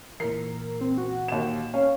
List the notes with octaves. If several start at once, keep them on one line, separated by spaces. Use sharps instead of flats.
A#2 E3 A#4 C7
C4
F#4
D#2 E7
C#4 F5